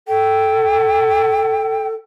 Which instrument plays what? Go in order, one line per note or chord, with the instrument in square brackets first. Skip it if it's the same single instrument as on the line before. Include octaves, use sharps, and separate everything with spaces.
[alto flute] A4 [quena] G5